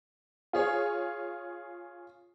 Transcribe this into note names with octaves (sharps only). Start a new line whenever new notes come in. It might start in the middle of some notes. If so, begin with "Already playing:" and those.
F4 G#4 C#5